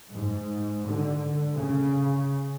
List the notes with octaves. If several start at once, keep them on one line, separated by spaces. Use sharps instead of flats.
G#2
D3
C#3